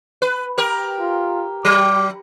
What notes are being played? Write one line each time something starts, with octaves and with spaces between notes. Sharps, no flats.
B4
G4 A#4
F4
F#3 D6